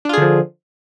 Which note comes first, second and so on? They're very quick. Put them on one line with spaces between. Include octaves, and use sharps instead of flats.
D4 F4 G#4 D3 F3